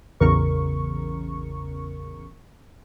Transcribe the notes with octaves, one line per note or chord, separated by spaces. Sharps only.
A1 E2 C#3 A#4 C#6